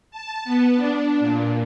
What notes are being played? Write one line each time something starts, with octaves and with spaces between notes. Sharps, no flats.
A5
B3
D4
A#2